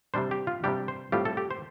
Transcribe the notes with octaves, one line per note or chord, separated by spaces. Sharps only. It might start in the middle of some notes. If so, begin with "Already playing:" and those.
C3 G3 D4 C5
G4
F4
C3 G3 D4 G4
C5
A2 G3 C4 F4 G4
A4
G4
C5